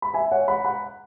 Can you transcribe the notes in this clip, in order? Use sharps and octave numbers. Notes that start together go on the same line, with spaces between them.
B5
E5 G#5
C#5 F#5
F#5 B5
F#5 B5